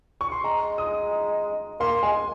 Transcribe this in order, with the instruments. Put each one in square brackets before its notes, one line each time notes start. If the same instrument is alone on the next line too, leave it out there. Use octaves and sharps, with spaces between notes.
[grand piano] C#6
C6
[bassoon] G#3 [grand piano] A#5
[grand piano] D#6
[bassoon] A#3 [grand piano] C6
[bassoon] G#3 [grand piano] G#5